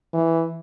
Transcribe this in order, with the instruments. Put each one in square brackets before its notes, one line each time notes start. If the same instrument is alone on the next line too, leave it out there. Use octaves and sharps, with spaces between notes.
[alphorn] E3